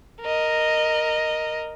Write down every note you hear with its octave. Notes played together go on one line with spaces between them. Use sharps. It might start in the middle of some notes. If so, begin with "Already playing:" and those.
A#4 D#5